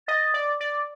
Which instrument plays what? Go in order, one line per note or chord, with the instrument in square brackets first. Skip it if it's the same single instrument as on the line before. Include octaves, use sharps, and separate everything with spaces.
[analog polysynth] D#5 [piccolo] A6
[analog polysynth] D5
D5